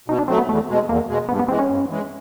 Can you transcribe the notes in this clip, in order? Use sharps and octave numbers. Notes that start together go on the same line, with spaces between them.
B2 D#4
D4
F#3 A3 C4
B3
E2 A3
B2 G#3
E2 A#3
B2 G#3
G2 B3
B3
E3 G#3 C4
C#4
G2
E3 G#3